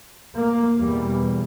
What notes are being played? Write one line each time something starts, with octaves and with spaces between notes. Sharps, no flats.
A#3
E2 B2 G3